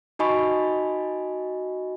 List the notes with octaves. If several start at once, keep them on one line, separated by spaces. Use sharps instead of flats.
D#4 F#4 D#5 G#5 B5 C#6